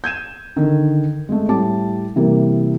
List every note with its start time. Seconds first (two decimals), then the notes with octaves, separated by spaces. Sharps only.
0.04 G6 G#6 D#7 E7
0.56 D3 D#3
1.29 G#3 A3
1.49 A2 G3 A5 D6
2.16 C3 E3 G3 A#3